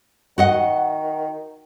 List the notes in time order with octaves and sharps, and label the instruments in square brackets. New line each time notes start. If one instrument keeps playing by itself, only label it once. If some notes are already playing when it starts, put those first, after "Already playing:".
[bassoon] D#3 [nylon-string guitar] F#4 D#5 F#5